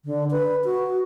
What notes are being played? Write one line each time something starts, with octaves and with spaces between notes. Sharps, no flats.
D3
B4
F#4